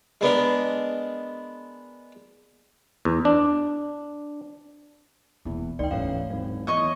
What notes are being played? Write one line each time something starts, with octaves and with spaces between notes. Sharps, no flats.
G#3 B3 D4 A#4
E2
D4
E1 E2 A#2
D2 G#2 D#3 D5 G5
D#1 A1 G#2 C#5 F5
G#1 F#3
E2 C#5 D#5 C#6